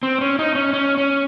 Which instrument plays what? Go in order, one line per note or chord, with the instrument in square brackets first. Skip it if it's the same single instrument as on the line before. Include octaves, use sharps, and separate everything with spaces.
[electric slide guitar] C4
C#4
D#4
C#4
C#4
C#4